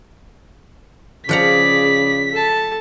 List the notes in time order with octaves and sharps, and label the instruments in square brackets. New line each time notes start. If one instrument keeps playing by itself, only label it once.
[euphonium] C#3 [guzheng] F3 F#5 A#5 [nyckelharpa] G#4 D5 [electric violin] B6
[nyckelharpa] A4 A5